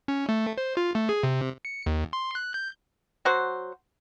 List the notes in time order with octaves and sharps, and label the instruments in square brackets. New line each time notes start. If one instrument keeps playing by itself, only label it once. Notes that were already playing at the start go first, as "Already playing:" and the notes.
[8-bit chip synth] C#4
A3
C5
F4
A3
G#4
C3
C#7
D#2
C6
F#6
G6
[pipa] F#3 F#4 C5